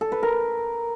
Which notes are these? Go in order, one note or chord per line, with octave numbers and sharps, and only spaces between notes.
A4
B4
A#4